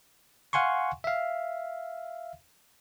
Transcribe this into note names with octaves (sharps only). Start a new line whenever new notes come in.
F5 F#5 G#5 C6 C#6
E5 F5